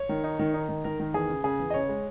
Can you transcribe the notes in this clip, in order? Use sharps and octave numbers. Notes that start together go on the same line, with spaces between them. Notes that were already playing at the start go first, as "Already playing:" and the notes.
Already playing: C#5
D#3
D#4
D#3
D#4
D#3
D#3 A#4
D#3
E2 G#4
C#3
C#3 G#4
E2
D#5
C#3 C#5
G#3